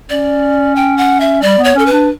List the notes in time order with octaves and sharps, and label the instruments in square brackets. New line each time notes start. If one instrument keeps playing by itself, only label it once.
[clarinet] C#4 [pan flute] D5
[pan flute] G5
F#5
E5
[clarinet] G3 [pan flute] D5
[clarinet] B3
[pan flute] C#5
[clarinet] C#4 [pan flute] A4
[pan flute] B4
[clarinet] D4